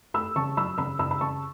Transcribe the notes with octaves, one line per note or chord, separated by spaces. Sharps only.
A3 B5 E6
C#3 A5 C#6
F#3 B5 E6
C#3 B5 E6
C#3 B5 E6
B5
C#3 A5 C#6